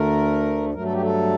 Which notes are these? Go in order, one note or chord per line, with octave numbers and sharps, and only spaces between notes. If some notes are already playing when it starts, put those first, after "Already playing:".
Already playing: D2 D3 A3 A#4
G2 F#3 A3 A#4
A4
G4
A4